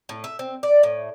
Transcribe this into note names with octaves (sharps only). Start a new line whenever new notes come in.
A2
E5
C4
D5
A2